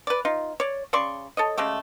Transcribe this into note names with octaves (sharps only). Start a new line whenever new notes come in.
B4 D5
D#4 F4
C#5 D5
C#3 D5 C6 C#6
A4 C#5 D#5
C#3 G#3 A3 G4